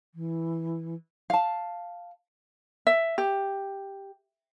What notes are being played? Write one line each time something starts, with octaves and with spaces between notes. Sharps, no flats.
E3
F5 A5
E5
G4